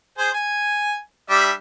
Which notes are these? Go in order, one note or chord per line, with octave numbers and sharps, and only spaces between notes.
G#4 C5
G#5
G3 D4 E5